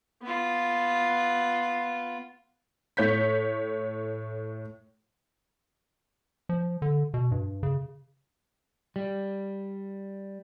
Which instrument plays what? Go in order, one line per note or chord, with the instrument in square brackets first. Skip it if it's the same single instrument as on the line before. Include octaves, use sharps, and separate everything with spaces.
[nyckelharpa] B3 F4
[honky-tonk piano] A2 C#5 G6 B6
[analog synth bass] F3
D3
B2
G2
C#3
[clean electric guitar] G3